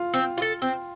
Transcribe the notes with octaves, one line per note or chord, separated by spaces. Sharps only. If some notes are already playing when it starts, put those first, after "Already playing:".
Already playing: F4
C4
F4
A4
C4